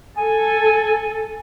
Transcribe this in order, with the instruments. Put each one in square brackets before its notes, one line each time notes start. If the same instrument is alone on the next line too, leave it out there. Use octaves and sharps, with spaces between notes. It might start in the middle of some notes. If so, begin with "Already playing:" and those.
[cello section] A4 [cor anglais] G#5